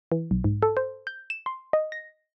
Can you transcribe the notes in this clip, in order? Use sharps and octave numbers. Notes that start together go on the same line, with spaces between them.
E3
B1
G#2
A4
C5
G6
E7
C6
D#5
A#6